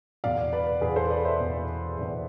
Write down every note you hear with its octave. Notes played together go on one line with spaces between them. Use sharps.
E2 B2 D5 F5
B4 D5
E2 B2 G#4 B4
A4 C5
B4 D5
C5 E5
E2 B2
E2 B2